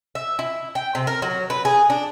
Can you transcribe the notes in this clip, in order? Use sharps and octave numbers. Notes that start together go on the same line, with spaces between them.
E5
E4
G5
C3
A#4
F#3
B4
G#4
D4